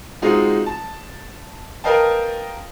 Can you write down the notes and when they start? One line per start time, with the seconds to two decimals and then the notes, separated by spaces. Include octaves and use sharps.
0.22 G#3 C4 D#4 F4 F#4
0.66 A5
1.84 A#4 B4 D#5 F5 G5 A5